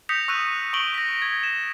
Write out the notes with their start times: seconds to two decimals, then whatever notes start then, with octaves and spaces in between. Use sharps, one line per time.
0.09 D#6 G6 A#6 B6 C#7 F7
0.28 C#6 E6 F#6 G6 D#7
0.73 C#6 C#7 D7 F#7 G7
0.94 A#6 B6
1.22 G#6
1.43 E7